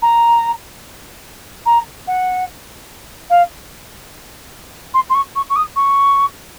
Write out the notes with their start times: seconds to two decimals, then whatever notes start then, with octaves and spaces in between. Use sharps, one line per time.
0.02 A#5
1.66 A#5
2.07 F#5
3.30 F5
4.94 C6
5.10 C6
5.15 C#6
5.36 C#6
5.50 C#6
5.56 D#6
5.76 C#6